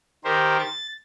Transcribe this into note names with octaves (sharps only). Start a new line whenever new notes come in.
D#3 G4 A#4 C5
A6